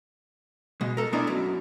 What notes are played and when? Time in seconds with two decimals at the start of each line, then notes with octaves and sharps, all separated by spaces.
0.81 B2 G#3
0.97 A4 A#4
1.12 G#3 B3 D4 E4 A#4 D5
1.27 F#2 F#3